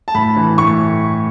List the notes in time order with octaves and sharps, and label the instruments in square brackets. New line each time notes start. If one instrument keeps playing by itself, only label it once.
[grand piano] A5
A2 B5
E3
A2 C#6